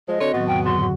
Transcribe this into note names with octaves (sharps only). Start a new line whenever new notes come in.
F3 G#3 D#5
D3 C4 F#4 C#5
A2 D#3 F#3 B3 F#4
F2 C#3 G5
G#2 D3 F#3 F#4 C6
F#4